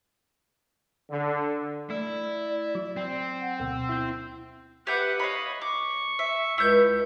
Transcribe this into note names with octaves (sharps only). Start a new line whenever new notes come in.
D3
A3 E4 D5
F#3
C4
F#5
D2 B2 E6
E4 G6
G4 B4 E5 F#5 G6
C#5 D#5 F5 B5
C#6 D6
E5
C#2 E4 G6